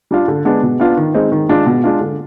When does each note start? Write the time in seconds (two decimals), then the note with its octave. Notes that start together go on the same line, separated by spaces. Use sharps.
0.11 G3 D4 F4
0.28 D3
0.45 G#3 B3 D4
0.63 B2
0.80 B3 D4 F4
0.97 D#3
1.14 G#3 C4 D#4
1.32 D#3
1.49 G#3 D4 F4
1.66 B2
1.84 G#3 D4 F4
2.01 D3